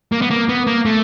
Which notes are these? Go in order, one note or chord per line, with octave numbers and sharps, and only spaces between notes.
A#3
B3
A#3
B3
A#3
A3